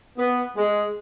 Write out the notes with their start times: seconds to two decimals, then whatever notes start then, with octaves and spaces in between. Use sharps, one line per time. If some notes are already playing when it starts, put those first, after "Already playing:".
0.17 B3
0.56 G#3